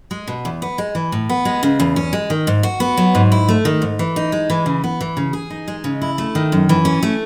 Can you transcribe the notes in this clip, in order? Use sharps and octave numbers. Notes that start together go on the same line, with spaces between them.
G#3
B2
E2
B3
G#3
E3
A2
B3
G#3
C#3
E2
C#4
G#3
D#3
G#2
F#4
B3
F#3
G#2
E4
A3
D#3
G#2
E3
D#4
G#3
E3
C#3
B3
E3
C#3
G#4
D#4
G#3
C#3
E4
A3
D#3
F#2
E3
C#4
A3